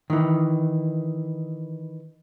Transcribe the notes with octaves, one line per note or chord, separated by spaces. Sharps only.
D#3 E3